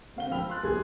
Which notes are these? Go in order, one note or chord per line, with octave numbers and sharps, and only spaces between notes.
D2 C4 F5 F#5 G7
F3 G5 B5 E6 F6 F7
C6 F#6 A6
B1 G4 G#4 C6 G#6